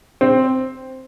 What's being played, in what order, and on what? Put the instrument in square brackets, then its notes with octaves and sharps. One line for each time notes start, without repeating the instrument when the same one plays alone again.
[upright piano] C4